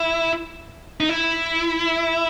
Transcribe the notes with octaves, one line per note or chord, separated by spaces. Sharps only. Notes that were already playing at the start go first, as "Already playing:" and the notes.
Already playing: E4
D#4
E4